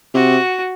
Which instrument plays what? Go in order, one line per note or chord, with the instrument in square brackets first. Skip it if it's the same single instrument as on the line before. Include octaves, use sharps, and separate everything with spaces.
[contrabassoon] C3 [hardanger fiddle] F#4